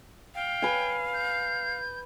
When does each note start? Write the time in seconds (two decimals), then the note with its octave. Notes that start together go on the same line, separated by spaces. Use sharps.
0.35 F5 G5
0.62 B4 G#5
1.14 G6